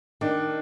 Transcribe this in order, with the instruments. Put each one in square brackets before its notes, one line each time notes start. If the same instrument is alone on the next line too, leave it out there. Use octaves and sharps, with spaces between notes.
[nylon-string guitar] D#3 [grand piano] D4